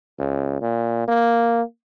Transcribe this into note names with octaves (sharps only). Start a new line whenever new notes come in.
C#2
A#2
A#3